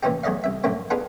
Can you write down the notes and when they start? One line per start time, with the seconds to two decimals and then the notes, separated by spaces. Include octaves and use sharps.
0.03 A#2 E3 F3 C#4 D#4 G4
0.24 E2 F#3 A3 D5 D#5 F5
0.44 C2 E5
0.64 F2 A#2 F#3 A3 A#3 C4
0.90 B3 D4 D#4 F4 G#4 B4